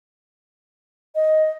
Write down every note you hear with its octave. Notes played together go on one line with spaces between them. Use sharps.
D#5